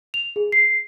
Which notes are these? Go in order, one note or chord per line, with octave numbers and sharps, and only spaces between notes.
F7
G#4
C7